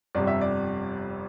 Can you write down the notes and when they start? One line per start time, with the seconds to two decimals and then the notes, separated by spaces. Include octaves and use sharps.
0.15 G1 F2 C3 G3 D5
0.27 E5
0.41 D5